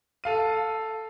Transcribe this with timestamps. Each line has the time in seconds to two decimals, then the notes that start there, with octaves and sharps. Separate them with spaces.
0.24 A4 F5 D#7